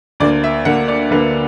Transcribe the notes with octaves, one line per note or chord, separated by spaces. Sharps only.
D2 D3 A#3 D5
E5
D2 D3 A#3 F#5
D5
D2 D3 A#3 B4